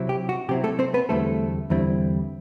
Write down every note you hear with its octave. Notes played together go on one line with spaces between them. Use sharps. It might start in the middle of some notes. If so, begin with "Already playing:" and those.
Already playing: C3 F#3 C4 E4
G4
F#4
C3 F#3 C4 E4 G4
A3 A4
C4 C5
B3 B4
E2 D3 G3 A3 C4 E4 A4
E2 D3 G3 C4 E4